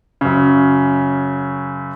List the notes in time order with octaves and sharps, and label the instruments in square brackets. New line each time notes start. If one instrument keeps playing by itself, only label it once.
[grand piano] F#2 C#3